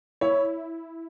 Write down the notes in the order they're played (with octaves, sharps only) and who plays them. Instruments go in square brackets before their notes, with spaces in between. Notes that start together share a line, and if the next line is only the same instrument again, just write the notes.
[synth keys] E4 [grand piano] C#5